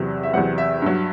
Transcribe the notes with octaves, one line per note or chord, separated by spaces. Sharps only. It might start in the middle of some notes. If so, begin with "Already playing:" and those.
Already playing: E2 C3 F#3
E5
E2 C3 F#3 F#5
E5
G2 F#3